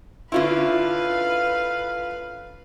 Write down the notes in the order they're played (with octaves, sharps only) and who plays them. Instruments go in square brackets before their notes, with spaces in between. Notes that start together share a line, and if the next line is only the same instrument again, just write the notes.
[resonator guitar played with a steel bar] D3 C#4 E4 [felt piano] F4 C6 [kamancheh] B4 F5